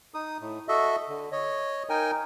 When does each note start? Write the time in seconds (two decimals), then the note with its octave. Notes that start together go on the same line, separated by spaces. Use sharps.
0.14 D#4 D#6
0.41 A2
0.68 F#4 A4 D#5 E5
1.08 D3
1.32 C#5 D#5
1.89 D#4 A#4 G5 G#5